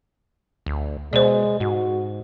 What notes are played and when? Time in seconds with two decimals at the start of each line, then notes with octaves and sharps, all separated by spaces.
0.66 D2
1.13 B2 G#3 C5 D5
1.60 G#2 F#4